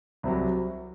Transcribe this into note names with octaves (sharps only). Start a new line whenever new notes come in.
C2 C3 F#3